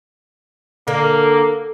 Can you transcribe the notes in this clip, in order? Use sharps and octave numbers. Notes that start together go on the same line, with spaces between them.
D3 A#3